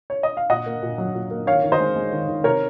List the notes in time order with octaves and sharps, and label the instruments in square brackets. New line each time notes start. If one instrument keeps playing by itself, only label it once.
[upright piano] C#5
D#5
F5
A#2 D#5 F#5
A#3
A#2
F#3
A#2
A#3
D#3 C#5 F5
D#3
C5 D#5
G#3
G#3
D#3
D#3
C3 A#4 C#5